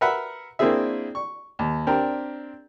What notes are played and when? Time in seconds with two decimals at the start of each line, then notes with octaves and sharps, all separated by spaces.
0.01 A#4 B4 E5 F#5 B5
0.59 A#3 C4 D4 E4 G#4 E5
1.15 C#6
1.59 D#2
1.87 C4 D4 G4 A#4